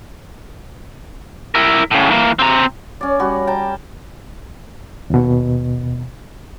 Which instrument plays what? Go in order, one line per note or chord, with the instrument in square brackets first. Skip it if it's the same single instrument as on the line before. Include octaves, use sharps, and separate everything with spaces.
[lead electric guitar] E4 A#4
A2 C#3
E3 A#3
C4 A#5
[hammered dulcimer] C#4 D5
G3 F#4
G5 A5 A#5
[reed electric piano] D#2 B2